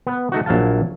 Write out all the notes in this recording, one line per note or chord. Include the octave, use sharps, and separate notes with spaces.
B3 B4
A3 D#4 F#4
A#1 F#3 E4 F5 A5